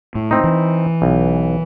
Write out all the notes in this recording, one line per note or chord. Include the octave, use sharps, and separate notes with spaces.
A2
C4 D#4
E3
B1